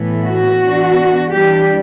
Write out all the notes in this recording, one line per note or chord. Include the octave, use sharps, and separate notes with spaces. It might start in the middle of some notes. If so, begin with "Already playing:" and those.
Already playing: A2 E3 B3
F#4
E3 B3 D4
E3 G3 D4 G4